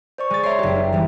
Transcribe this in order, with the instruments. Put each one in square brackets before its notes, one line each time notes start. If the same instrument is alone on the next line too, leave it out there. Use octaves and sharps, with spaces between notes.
[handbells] C5 D5 C#6
[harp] G#3 A6
[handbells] C#5 D5 E5 [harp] A#5 C6
[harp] F#1 G4
[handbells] D#4 E5
[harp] E3 G3